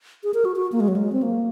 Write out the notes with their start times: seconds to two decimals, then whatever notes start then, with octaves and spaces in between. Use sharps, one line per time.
0.23 G#4
0.34 A#4
0.45 F#4
0.56 F#4
0.72 A#3
0.80 G#3
0.88 F#3
0.96 G#3
1.12 C4
1.22 A#3